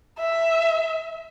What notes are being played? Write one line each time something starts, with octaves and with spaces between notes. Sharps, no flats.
E5